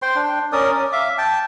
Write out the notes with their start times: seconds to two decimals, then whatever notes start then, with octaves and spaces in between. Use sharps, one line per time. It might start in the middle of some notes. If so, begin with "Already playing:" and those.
0.02 C5 G5 C6
0.16 D4 G5
0.52 C#4 A#4 D5 D#6
0.72 C#4
0.93 E5 F5 D6
1.18 G5 A5